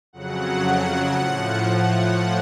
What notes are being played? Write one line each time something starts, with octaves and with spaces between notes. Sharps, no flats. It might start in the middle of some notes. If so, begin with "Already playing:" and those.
F2 C#3 F#3 F#5
A2 F3